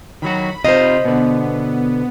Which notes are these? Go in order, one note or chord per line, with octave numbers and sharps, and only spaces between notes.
D#3 F#3 F#4 B5
C3 D#4 F4 C5 D#5
B2 D3 B3